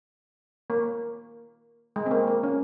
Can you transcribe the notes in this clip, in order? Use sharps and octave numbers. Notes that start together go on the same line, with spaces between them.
A#3
G#3
C4
A#3
A#3
C#4